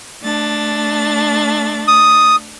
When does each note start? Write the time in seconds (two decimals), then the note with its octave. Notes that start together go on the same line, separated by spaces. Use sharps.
0.23 A3 D4 A6
1.88 D#6